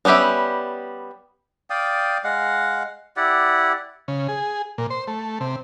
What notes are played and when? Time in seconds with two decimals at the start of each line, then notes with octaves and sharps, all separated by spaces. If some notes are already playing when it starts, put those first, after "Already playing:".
0.05 G3 B3 C#4 G4 E5
1.70 D5 F5 G5 D#6
2.24 G#3 F5 F#5
3.17 E4 G4 D5 F#5
4.08 C#3
4.28 G#4
4.78 A#2
4.90 C5
5.08 A3
5.40 C3